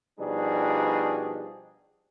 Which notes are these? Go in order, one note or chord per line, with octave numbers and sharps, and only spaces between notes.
B2 F3 G3 D4 D#4 G#4